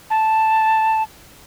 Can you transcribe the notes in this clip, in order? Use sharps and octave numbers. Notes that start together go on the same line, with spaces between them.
A5